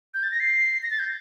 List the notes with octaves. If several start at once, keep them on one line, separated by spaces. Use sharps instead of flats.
G6
A6
A#6
C7
A#6
A6
G6